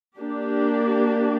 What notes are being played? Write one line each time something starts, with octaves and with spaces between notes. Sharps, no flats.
A#3 D4 G4